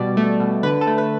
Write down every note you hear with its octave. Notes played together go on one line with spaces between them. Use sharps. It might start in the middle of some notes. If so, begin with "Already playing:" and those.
Already playing: B2 G3 D5
A3
B2
D3 B4
A4
A3
B4